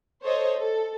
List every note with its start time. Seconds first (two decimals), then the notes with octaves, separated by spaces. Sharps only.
0.24 A4 C5 C#5 D#5
0.56 A4